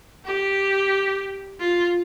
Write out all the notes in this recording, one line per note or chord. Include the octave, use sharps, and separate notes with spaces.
G4
F4